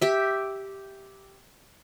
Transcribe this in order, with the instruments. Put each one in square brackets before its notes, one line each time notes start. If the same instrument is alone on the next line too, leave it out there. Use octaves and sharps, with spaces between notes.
[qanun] G4 E5